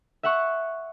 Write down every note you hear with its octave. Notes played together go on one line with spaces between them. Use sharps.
E5 F#5 C#6